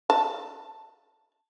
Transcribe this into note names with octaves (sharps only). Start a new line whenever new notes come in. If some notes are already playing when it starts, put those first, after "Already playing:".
A5